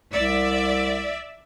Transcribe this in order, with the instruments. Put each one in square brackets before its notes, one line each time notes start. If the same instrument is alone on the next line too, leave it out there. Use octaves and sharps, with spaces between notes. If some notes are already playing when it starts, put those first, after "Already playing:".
[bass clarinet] C2 [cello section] D5 E5